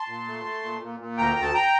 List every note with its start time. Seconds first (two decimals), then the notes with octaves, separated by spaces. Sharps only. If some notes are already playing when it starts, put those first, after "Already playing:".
Already playing: A5 C6
0.08 A#2
0.27 A3
0.45 A3
0.63 A#2
0.82 A#2
1.00 A#2
1.18 D2 G5 A#5
1.36 D2
1.42 A5
1.54 G5 A#5